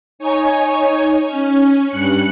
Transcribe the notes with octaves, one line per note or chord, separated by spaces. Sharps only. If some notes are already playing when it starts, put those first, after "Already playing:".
D#4 C#5 G#5
C#4
G2 F#6 C#7